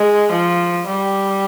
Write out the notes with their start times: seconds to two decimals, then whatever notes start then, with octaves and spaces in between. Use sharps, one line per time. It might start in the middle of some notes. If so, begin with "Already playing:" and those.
Already playing: G#3
0.32 F3
0.87 G3